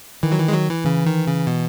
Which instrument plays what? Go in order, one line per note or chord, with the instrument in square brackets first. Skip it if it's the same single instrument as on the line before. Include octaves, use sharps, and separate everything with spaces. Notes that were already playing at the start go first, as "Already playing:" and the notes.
[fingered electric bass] D#3 [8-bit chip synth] E3
[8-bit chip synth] F#3
E3
G#3
F#3
E3
[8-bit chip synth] C#3 [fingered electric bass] E3
[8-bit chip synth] D#3
C#3
B2